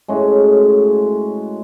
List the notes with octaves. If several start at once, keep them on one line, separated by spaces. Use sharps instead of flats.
A2 G#3 C#4 F#4